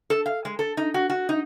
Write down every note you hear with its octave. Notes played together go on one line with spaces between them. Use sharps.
A4
F5
G#3
A4
D#4
F#4
F#4
D#4